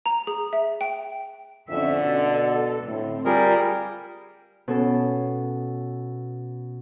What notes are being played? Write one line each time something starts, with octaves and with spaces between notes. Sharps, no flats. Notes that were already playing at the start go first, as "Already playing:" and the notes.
A#5
G#4
E5
G5
F2 D3 C#4 E5
B2 A4
A2 D3 C4
G3 F4 G#4 A#4
B2 C#4 A4